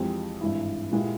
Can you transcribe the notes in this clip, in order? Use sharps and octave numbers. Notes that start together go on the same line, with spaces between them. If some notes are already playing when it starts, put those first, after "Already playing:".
Already playing: F2 E3 G#3 C4 G4
G#1 G2 E3 G#3 E4
A#2 G#3 E4 G4